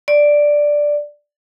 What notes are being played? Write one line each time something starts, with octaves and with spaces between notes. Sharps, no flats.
D5